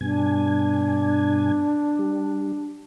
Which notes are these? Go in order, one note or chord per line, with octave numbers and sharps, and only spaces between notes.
G2 B2 D4 G#5
G3